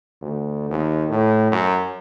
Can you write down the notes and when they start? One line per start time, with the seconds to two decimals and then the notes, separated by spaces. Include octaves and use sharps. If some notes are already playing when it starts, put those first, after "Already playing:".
0.22 D2
0.70 D#2
1.10 A2
1.52 F#2